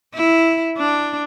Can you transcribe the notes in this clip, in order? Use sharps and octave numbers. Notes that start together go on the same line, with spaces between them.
E4
D4